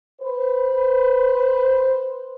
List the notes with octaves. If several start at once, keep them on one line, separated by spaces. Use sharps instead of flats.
B4 C5